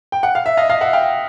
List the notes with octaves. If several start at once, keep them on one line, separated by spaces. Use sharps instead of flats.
G5
F#5
F5
E5
D#5 F5
D#5 F5
E5 F#5
F5 G5